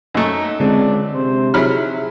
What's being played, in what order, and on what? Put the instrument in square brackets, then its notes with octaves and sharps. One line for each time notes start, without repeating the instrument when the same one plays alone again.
[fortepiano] F#2 A3 [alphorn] D#4 [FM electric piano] G#5
[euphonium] C#2 [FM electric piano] D3 G#3 C4 [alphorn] D4
[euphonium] C3 [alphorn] C5
[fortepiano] F#3 B5 F6 [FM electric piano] D#4 G#4 E5 [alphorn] E4